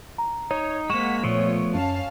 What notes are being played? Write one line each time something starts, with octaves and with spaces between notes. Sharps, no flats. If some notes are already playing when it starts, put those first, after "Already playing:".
A#5
D#4 C#5
G#3 A#3 C4 F#5 C#6 B6 E7
A#2 F3 A3 B3 C#5
F#2 C#4 F5 A5